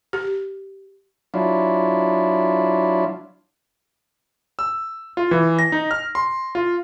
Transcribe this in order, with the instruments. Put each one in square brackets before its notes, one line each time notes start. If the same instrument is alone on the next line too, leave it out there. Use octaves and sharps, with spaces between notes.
[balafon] G4
[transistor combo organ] F#3 D4 E4 F4
[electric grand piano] E6
F4
E3
A#6
D#4
F6
C6
F4